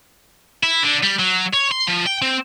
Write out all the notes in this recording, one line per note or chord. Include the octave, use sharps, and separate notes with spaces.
E4
D3
G3
F#3
C#5
C6
F3
G5
C4